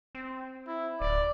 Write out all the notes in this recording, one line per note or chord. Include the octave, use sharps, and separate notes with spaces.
C4
E4
D1 D5